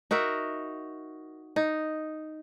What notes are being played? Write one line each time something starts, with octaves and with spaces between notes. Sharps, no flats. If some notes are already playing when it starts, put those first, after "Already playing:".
D#4 F#4 A#4 E5
D#4